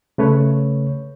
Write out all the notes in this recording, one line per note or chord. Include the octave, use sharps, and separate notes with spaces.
C#3 A3 B4 C#5